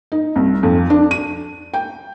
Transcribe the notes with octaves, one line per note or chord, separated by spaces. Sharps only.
D#4
C2
F2
D4
D#7
G5